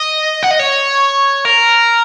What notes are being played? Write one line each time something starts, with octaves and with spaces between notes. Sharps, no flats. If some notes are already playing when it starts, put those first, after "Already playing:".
Already playing: D#5
F#5
D#5
C#5
A#4